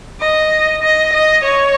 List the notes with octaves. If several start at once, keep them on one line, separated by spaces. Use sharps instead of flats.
D#5
D#5
D#5
C#5